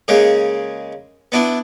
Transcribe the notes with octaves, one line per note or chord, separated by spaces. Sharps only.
C#3 G#3 A#3 C#4
B3 D4 E4